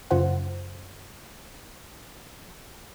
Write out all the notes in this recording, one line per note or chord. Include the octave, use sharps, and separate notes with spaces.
F#2 C#3 F4 C5 F#5